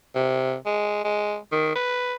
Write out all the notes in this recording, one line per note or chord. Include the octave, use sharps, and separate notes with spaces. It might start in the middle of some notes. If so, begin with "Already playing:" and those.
C3
G#3
G#3
D#3
B4